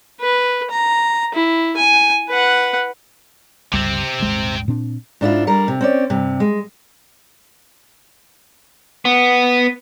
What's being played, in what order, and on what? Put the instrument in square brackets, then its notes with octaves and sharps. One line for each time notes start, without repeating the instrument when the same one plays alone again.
[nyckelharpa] B4
A#5
E4
G#5
B4 F#5
[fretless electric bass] G1 C#2 G3 [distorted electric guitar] C3 C4
[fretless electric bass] D#1 G#1 G#3
A#2 C4 D4
[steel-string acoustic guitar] G#2 D4 E4 F4
G3 D4 A#4
C3
C4 C#4 D5
G2 C3
G#3
[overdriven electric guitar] B3